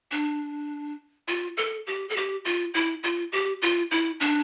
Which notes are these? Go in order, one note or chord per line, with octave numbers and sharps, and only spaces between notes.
D4
F4
A4
G4
A4
G4
F4
E4
F4
G4
F4
E4
D4